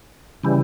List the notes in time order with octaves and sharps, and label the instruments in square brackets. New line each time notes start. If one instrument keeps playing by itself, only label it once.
[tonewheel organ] C#3 E3 G3